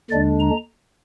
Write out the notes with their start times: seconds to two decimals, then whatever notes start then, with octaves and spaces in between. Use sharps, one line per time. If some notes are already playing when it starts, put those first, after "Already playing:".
0.11 D#2 D3 G#3 D4 D5
0.40 A#5